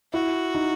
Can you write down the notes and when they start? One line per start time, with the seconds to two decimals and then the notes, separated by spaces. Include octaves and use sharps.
0.13 E4 F#4
0.55 D#4